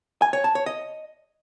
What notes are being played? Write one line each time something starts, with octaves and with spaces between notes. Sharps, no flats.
G#5
C#5
A5
C#5
D#5